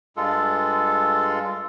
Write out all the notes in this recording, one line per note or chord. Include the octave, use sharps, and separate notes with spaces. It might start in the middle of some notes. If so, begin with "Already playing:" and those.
G2 G#3 F4 A4